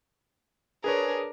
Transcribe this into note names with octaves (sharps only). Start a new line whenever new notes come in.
D4 G#4 A#4 B4 C#5